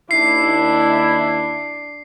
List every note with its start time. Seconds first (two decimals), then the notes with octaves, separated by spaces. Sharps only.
0.11 D#2 D4 E4 C7